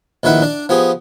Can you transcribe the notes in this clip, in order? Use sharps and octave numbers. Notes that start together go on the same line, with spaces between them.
A#1 D#3 E4 B4 F#5
D4 D5
F3 B3 G4 G#4